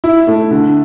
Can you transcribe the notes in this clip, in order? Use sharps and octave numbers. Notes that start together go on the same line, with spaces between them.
E4
A3
D3